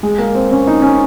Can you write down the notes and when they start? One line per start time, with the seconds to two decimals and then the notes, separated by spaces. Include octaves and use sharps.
0.03 G#3
0.19 A#3
0.35 C4
0.51 C#4
0.67 D#4
0.82 C#4